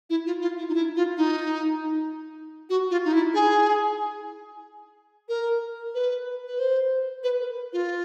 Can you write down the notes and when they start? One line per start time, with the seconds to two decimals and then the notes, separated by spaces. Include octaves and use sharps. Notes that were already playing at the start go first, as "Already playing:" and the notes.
0.10 E4
0.26 F4
0.41 F4
0.58 E4
0.69 D#4
0.74 E4
0.96 F4
1.17 D#4
2.70 F#4
2.91 F4
3.05 D#4
3.13 E4
3.34 G#4
5.29 A#4
5.95 B4
6.47 B4
6.59 C5
7.23 B4
7.40 A#4
7.73 F4